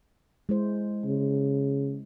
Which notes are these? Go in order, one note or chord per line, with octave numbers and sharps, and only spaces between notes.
G#3 E4 C5
C#3